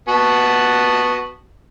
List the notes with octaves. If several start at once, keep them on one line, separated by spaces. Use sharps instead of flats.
B3 F#4 A5